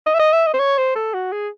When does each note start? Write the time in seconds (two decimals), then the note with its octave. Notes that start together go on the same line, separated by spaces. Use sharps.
0.06 D#5
0.14 E5
0.19 D#5
0.33 E5
0.47 D#5
0.54 C5
0.59 C#5
0.78 C5
0.96 A4
1.14 F#4
1.32 G#4